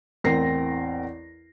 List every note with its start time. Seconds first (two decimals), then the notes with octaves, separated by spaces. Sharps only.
0.24 A1 E2 C4 A#4 A#6 C7